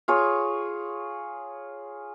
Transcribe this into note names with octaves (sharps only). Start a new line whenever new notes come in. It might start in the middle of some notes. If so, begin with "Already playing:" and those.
F4 G#4 C#5